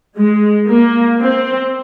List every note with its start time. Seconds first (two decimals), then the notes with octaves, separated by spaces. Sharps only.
0.16 G#3
0.68 A#3
1.20 C4